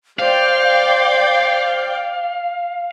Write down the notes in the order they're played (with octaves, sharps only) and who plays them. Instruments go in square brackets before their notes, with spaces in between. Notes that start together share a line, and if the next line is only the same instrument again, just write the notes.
[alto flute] C5 [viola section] D5 G5 [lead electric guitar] F5